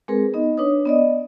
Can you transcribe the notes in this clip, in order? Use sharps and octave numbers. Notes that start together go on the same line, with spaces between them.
G#3 C4 G#4 A#4 B4
B3 D#4 D#5
D4 B4 C#5 D#6
B3 D5 D#5